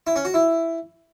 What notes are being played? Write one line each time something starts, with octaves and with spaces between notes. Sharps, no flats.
E4
C#4
F#4
E4